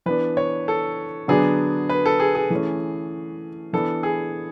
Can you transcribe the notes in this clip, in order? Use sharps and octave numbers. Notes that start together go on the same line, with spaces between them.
E3 B3 D4 B4
C#5
A4
D3 F#3 B3 D4 G#4
B4
A4
G#4
G#4
E3 A3 C#4
E3 B3 D4 A4
G#4